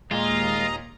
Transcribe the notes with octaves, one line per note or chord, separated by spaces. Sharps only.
D#2 A#2 G#3 F4 D#5 A#5